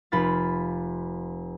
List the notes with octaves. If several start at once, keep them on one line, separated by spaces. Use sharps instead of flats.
F1 F4 B5 F6 A6